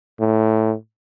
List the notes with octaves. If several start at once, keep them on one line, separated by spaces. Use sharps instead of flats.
A2